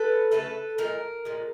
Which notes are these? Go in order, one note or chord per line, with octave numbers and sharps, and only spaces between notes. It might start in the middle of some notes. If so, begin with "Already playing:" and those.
Already playing: A4 B4
C#3 F#3 A3 A4 B4
A#2 F3 G#3 A#4
A#2 F3 G#3